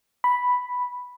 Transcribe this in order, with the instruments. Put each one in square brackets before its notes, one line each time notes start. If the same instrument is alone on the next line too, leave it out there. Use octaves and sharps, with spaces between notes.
[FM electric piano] B5